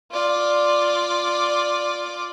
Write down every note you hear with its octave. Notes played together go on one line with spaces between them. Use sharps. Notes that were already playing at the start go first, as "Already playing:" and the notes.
F4 D5